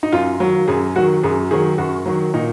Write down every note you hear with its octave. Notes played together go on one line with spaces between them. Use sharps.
D#4
F#2 F4
D#3 F#3
F#2 G#4
D#3 F#3 F#4
F#2 G#4
D#3 F#3 G#4
F#2 F#4
D#3 F#3
A#2 D#4